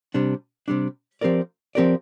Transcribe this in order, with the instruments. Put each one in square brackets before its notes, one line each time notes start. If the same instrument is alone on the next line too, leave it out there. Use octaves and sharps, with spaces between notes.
[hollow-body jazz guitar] C3 G3 D4
C3 G3 D4
F3 C4 G4 A#4 D5
F3 C4 G4 A#4 D5